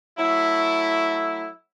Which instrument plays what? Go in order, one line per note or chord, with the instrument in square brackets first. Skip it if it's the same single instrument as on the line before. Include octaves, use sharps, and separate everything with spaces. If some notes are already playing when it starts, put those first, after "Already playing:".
[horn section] F#3 A3 E4